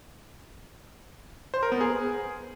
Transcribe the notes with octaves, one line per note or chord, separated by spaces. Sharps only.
C5
A#4
B3
G#4